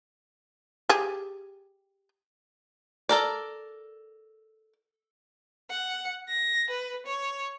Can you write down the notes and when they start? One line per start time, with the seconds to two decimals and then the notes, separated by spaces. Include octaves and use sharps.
0.89 G4 G#4
3.09 A4 A#4 D5
5.70 F#5
6.29 A#6
6.70 B4
7.06 C#5